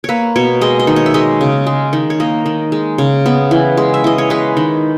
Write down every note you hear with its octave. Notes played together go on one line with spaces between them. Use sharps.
A#3 B4 C#5
B2 C#5
G#3 D#5
D#5
D#3
C#5
E5
G#3 D#5
C#3
G#3
D#3
C#5
A#3 D#5
D#3
G#3
C#3
B3
E3
G#3
E5
E3 D#5
C#5
G#3 B4
D#3